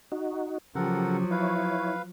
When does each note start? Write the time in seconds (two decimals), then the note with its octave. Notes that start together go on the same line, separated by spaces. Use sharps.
0.12 D#4 F#4
0.75 C#3 F3 F#3 G4 A4 A#4 F#5
1.31 E4 B4 C#5 F5